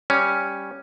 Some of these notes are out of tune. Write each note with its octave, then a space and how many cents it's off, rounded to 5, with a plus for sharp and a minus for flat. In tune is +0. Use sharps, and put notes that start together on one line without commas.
G3 +0 C#4 +0